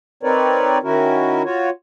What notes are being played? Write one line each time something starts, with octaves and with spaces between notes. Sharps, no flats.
C4 D#4 A#4 B4 C#5 D5
D#3 C#4 E4 F#4 A#4
F4 F#4 C#5